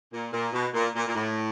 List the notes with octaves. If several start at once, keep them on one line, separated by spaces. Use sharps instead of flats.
A#2
A#2
B2
A#2
A#2
A#2
A2